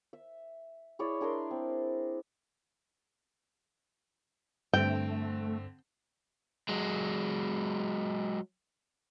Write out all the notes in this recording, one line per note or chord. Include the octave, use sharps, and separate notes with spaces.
E5
E4 G#4 C#5 D5
D4 G#4 A#4 C6
C4
G2 D3 A3 C4 G5
F#3 G#3